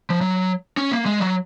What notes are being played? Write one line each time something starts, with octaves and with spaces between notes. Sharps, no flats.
F3
F#3
C#4
A#3
G#3
F#3